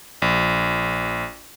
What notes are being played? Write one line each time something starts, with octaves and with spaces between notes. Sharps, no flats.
A#1